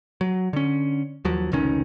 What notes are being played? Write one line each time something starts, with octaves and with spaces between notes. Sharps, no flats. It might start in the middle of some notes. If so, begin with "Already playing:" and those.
F#3
D3 C#4
D#2 F3 F#3
F1 C#2 D#3 C#4